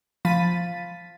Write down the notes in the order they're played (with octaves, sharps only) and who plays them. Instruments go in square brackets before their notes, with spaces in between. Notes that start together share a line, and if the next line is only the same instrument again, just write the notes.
[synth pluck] F3 F5 B5 A6 B6 D#7